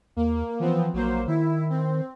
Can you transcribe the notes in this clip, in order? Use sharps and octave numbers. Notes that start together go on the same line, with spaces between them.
D#2 A#3
E3 F3 B3 C4
A#1 F#3 A#3 C5
D#3 E4
C4